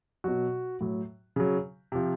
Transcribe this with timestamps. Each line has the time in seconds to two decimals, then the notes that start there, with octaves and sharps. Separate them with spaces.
0.24 B2 F#3 F#4
0.81 A2 F#3
1.36 C#3 F#3
1.92 C3 F3